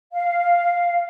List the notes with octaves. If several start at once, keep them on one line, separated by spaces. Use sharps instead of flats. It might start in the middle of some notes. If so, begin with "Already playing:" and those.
F5